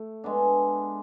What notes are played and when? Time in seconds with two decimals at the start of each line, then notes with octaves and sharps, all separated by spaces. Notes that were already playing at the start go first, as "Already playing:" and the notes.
Already playing: A3
0.24 G#3 B3 D4